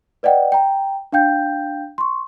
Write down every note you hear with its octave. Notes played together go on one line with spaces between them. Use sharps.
B4 D5 D#5 F#5 G5
G5 A#5
D4 F5 G5 G6
C6 C#6